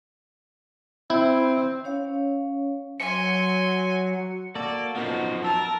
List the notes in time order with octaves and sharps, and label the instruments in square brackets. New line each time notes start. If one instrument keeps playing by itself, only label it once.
[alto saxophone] C4 [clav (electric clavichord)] E4
[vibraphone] C#4 C#5 F5
[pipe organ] F#3 [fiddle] G#5 C6 [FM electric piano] C#7
[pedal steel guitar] A#3 F#4 A4 [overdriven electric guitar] D5
[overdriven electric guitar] F#2 F3 [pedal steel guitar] B3 D#4 F#4
[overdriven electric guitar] A#4 A#5 [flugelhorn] A5 [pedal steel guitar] E6